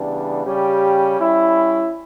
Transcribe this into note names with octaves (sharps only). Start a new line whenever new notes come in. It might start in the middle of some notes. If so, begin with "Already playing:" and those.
Already playing: C#3 E3 G3 B3 D4
C#3 G3 C#4 G4
G3 C#4 E4